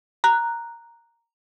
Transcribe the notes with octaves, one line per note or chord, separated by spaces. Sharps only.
A#5 F#6